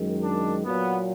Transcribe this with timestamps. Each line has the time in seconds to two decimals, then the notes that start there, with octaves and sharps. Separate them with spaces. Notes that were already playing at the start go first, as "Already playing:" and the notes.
Already playing: F#2 D#3 G#3
0.21 D4
0.65 A#2 F#3 B3